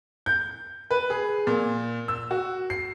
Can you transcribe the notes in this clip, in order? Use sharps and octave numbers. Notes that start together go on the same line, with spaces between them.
G6
B4
G#4
A#2
E6
F#4
C7